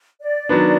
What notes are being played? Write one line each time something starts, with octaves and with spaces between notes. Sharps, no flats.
D5
D#3 F#3 B3 D4